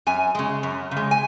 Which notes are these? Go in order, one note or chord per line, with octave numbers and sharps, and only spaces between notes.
F#2 G#5
C#3 G#3
F#2
C#3
G#3
G#5